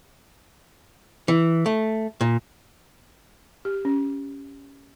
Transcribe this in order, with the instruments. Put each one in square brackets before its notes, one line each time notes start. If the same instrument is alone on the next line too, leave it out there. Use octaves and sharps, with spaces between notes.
[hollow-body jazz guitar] E3
A3
A#2
[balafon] G4
C#4